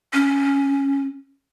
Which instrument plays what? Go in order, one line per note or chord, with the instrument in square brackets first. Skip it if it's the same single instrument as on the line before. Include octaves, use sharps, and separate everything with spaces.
[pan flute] C#4